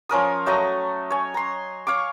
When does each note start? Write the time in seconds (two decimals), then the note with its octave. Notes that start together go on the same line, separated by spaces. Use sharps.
0.09 F3 C#4 A#4 D#6
0.46 F#3 A3 D#5 A#5
1.10 C#5 G#5
1.34 A#5 C6
1.87 C#5 F5 C#6 D6